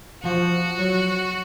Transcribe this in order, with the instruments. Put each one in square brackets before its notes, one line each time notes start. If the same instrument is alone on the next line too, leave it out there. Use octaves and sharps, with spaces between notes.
[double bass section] F3 [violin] F#4
[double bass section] F#3